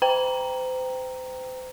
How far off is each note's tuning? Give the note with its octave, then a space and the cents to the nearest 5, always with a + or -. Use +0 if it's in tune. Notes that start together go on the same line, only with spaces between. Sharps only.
C5 -35 G5 +5 A#5 +0